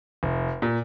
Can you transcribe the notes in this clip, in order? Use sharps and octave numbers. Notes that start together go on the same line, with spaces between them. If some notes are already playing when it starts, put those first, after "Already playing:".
F1
A#2